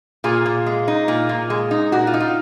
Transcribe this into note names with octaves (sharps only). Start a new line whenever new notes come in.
A#2 F4 G#4
A#2
G#3
D#4
A#2
A#2
G#3
D#4
A#2 F#4
F4
D#4
F4